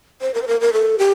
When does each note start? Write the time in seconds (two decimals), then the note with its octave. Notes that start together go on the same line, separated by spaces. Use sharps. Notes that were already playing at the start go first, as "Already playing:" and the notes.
0.21 C5
0.34 A#4
0.42 C5
0.47 A#4
0.61 A#4
0.73 A4
0.98 G4